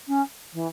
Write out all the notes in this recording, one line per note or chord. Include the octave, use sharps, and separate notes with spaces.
C#4
E3